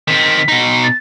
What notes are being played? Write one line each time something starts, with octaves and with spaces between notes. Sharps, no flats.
D#3 C4 B6
B2 D#4
A6